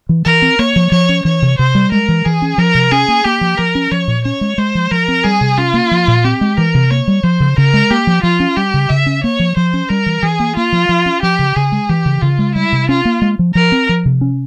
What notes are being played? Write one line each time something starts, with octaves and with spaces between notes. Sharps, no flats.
E3
E3 A#4
C4
A#3 C#5
F3
F3 C#5
C#4
E3 C#5
C3
C3 C5
G3
G#3 A#4
E3
E3 G#4
C#4
F3 A#4
C3
C#4 G#4
A#3
A#3 G4
F3
F3 A#4
C#4
F3 C#5
A#2
C#4 C#5
G#3
G#3 C5
F3
F3 A#4
C4
G3 G#4
C3
C#4 F4
A#3
F3
A#2
C4 G4
G#3
E3 A#4
C3
A#3 C#5
G3
F3 C5
C#3
C#3 A#4
G#3
A#3 G4
F3
F3 F4
C#4
G3 G4
C#3
C#3 E5
C#4
A#3 C#5
F3
F3 C5
C#4
G3 A#4
E3
E3 G#4
A#3
A#3 F4
F3
F3
C#4
F3 G4
C#3
C#3 G#4
G#3
E3 G4
C#3
C#3 F4
G#3
G3 E4
C3
C#4 F4
A#3
G#3
F3
F3 A#4
C4
F3
C3
C#4